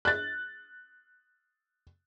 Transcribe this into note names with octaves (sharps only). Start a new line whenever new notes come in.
F#6 A6